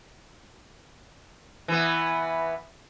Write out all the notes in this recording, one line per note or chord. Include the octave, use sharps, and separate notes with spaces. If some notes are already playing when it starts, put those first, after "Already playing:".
E3 B3